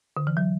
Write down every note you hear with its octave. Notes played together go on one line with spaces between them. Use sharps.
D3
E3
F#3